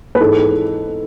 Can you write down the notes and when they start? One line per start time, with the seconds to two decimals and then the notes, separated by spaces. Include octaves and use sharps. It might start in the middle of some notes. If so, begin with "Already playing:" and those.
0.15 B4
0.20 G#2 E3 G#3 A4